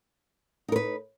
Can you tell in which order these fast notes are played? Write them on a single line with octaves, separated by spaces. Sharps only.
D#4 A#4 B4